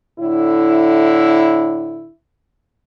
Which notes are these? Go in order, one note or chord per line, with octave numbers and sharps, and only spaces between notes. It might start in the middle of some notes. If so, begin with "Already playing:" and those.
A2 D3 E4